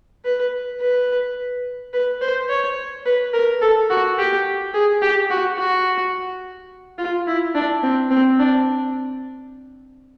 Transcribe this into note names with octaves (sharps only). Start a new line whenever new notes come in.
B4
B4
B4
C5
C#5
B4
A#4
A4
F#4
G4
G#4
G4
F#4
F#4
F4
E4
D4
C4
C4
D4